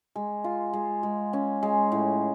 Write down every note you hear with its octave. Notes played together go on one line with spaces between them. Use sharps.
G#3
F4
G#3
G#3
C#4
G#3
A2